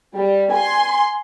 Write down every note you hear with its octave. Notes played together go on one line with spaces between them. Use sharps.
G3
G#5 C6